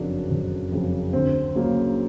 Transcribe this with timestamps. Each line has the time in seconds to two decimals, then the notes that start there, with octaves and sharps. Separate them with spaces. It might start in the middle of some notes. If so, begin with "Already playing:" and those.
Already playing: F#1 F2 C#3 F#3 D4
0.31 F#1
0.72 F2 C#3 F#3
1.13 D2 C4
1.55 C#3 F#3 A#3